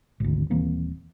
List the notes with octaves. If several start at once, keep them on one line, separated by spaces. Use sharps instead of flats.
G#1 D2
D#1 E3 A#3 C4